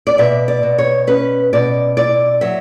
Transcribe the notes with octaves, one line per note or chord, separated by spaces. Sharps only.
D5
B2 E5
D5
B2
C#5
C#4 B4
B2 D5
E4 D5
F#3 E5